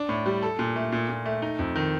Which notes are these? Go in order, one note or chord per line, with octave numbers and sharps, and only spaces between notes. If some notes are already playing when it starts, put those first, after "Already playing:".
Already playing: D4
A2
G3
A4
A#2
A3
A#2
A#2
A3
D#4
F2
D#3